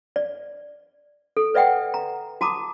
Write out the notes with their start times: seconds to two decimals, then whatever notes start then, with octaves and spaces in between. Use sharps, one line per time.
0.16 D5
1.37 A4
1.54 B4 D5 E5 F#5 G5
1.94 A#5
2.41 F#4 A5 A#5 D6 D#6